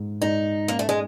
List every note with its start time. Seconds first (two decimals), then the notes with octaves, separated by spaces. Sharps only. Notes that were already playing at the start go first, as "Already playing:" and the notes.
Already playing: G#2
0.22 G#2 D#4
0.68 A#3 C#4
0.79 A3
0.89 G#3